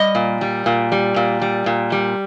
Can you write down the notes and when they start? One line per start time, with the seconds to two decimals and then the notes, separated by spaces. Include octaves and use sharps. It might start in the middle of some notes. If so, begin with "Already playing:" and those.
Already playing: G3 D#5
0.15 A#2
0.41 G3
0.66 A#2
0.92 G3
1.16 A#2
1.42 G3
1.66 A#2
1.92 G3